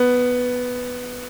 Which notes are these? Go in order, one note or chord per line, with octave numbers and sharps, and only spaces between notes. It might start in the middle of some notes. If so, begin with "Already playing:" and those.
Already playing: B3